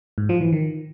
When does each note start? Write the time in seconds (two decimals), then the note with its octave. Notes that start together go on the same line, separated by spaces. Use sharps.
0.18 G#2
0.29 F3
0.41 E3
0.53 D#3